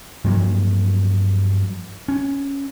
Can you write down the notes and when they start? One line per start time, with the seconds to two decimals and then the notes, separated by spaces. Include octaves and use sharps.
0.24 G2 F3 F#3 A#3
2.08 C#4